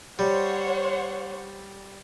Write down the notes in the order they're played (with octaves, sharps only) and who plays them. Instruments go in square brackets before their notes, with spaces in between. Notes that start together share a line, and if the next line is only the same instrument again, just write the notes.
[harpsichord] G3 [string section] C5 C#5 F#5